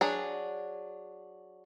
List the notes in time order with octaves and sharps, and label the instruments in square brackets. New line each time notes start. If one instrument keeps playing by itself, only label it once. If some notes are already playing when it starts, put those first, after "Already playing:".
[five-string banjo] F#3 D4 G#4